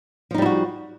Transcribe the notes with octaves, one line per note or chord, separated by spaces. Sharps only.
F3 G3 D#4 E4 F#4